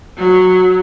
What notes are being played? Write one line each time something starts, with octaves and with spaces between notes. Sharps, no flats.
F#3